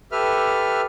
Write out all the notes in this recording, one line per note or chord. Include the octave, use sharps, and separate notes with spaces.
G4 A4 B4 E5 F6